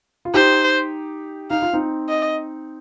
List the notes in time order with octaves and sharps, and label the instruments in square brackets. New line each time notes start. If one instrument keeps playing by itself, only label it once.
[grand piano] F4
[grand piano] D#4 G4 [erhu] C5
[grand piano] D#4 [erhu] F5
[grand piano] F4
C4 D#4
[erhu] D#5